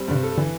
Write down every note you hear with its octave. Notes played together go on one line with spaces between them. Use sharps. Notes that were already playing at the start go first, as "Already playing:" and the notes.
Already playing: G3 C4
G2 D3
C3
A4
D3 E3